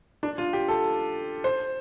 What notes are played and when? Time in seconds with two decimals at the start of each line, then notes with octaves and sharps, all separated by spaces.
0.23 D4
0.38 F4
0.53 G4
0.68 A4
1.44 C5